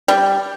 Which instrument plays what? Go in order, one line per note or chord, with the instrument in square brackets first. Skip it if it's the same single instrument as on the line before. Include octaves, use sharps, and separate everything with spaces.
[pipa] G3